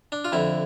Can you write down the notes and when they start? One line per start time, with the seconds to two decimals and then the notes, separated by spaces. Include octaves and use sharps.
0.12 D4
0.25 F4
0.32 F2 D3 E4